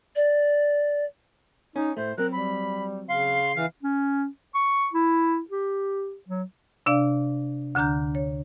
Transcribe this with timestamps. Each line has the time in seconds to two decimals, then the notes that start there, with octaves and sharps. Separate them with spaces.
0.16 D5
1.76 C#4 D#4
1.97 A2 A3 C5
2.18 F#3 C4 A#4 F#6
2.32 G3 B5
3.09 C#3 F5 C6 C7
3.56 E3 F5
3.83 C#4
4.55 C#6
4.93 E4
5.50 G4
6.28 F#3
6.86 C3 D4 D5 F5
7.75 D2 D3 D4 A#5 G6
8.15 C#5